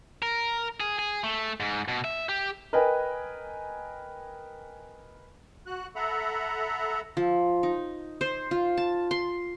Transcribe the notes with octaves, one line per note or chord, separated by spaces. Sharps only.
A#4
G#4
G#4
A3
G#2
B2
E5
G4
A#4 B4 D#5 G5 G#5
F#4 F#6
A4 E5 F#5 A#5 B5
F3
D#4
C5
F4
A5
C6